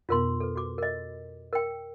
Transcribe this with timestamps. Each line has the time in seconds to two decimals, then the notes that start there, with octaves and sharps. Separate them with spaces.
0.09 F2 B2 B3 F4 A#4 C6
0.40 A4 B4
0.56 F#4 D6
0.78 A#4 D#5
1.53 A#4 G5